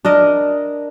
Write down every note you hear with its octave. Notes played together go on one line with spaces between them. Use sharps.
D4 A#4 D#5